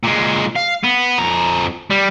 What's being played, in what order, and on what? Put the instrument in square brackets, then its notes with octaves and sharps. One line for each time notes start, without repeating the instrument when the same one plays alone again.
[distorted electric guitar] A#2 G#3
F5
B3
F2 A#5
G3